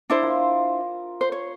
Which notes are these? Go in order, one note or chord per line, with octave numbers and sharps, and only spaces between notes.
D4 E4 C5
F4 A#4
C5
C#5